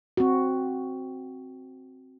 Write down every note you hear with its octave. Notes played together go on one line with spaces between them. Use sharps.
C4 F#4